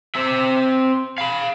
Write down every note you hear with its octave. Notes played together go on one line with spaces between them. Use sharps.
C4 E5
F5 B5